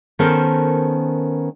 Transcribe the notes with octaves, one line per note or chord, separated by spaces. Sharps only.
D#3 B3 C#4 A4 A#4 C5